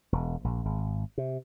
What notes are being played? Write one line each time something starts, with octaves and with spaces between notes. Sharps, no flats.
E1
A#1
G#1
C3